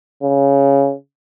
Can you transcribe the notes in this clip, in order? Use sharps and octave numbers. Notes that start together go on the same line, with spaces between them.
C#3